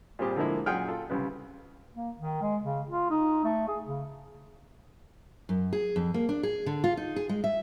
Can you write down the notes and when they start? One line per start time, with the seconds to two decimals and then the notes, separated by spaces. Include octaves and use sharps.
0.19 A#2 G3 C4 G4 G#4
0.36 D3 F3 G#3 A#3 E4
0.66 F#2 A#2 G#4 F#5 G5 F6
0.88 F4 A4
1.10 C2 C#3 B4
1.95 A#3
2.18 D#3
2.41 G#3
2.62 C#3
2.90 F4
3.10 D#4
3.44 A3
3.68 G#4
3.85 C#3
5.49 F#2
5.73 G#4
5.96 F2
6.14 A#3
6.29 D4
6.43 G#4
6.66 D3
6.84 F4
6.97 D#4
7.16 G#4
7.29 G#3
7.44 E5